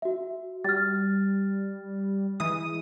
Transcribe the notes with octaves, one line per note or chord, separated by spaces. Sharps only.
F#4 E5
G3 F6 A6
E3 G#3 D#6